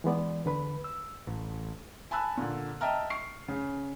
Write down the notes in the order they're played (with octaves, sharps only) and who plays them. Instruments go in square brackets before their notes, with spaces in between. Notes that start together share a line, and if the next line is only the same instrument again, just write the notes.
[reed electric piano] E3 G#3 B3 D5
E2 D3 B4 B5
E6
[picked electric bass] A1
[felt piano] G#5 A5 B5 E6 F#6
A#2 D3
D#5 E5 G5 A5 A#5 F6
C#6 C7
C#3